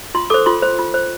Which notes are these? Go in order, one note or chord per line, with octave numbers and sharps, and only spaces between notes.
F4 C6
A4 C5 D6
F4 C6
C5
F4
C5